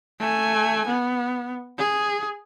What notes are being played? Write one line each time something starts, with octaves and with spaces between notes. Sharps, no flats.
A3 G#5
B3
G#4